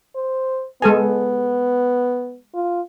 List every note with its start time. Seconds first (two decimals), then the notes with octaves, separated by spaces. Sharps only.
0.16 C5
0.82 G#3 B3 A4 G#5
2.54 F4